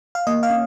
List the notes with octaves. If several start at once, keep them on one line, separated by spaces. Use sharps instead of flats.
F5
A#3 D#5
F5
C#4